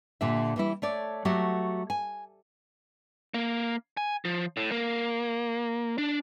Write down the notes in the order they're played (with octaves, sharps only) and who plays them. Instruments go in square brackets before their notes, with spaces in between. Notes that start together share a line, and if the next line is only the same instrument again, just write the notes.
[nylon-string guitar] A#2 D3 G4 E5
E3 G3 E4
A3 C#5 D5
F#3 A3 F#4 G4
G#5
[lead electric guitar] A#3
G#5
F3
A2
A#3
D4